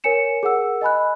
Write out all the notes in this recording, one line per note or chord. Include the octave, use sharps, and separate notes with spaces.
A#4 C#5 G#5 C#7 E7
G#4 A#4 F#5 E6
D#5 G#5 B5 F#6